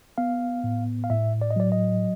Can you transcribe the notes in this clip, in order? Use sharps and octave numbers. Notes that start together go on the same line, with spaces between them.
B3 F5
A2
F5
A2 E5
D5
D#5
F#3 D5
D#5